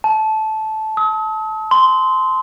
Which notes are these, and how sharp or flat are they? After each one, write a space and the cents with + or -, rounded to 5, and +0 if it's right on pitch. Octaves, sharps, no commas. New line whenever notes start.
A5 -15
D#6 +45
C6 -10